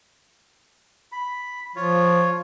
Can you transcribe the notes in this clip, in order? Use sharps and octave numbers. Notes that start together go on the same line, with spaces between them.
B5
F3 F4 C#5